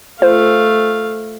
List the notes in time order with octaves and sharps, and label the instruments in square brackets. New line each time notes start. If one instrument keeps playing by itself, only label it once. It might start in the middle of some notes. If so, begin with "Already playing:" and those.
[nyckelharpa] A3 F5 [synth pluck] F4 C5